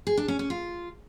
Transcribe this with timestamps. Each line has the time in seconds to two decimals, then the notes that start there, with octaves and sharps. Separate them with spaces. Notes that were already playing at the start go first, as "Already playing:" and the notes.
0.07 G#4
0.17 D4
0.28 C#4
0.39 C#4
0.50 F4